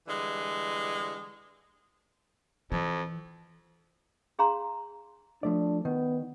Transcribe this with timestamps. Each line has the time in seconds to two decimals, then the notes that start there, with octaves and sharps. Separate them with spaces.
0.08 D3 E3 G3 G#3
2.72 F2 E3
4.39 D4 G#4 F5 A#5 C6
5.43 F3 A3 D4 D5
5.85 D#3 B3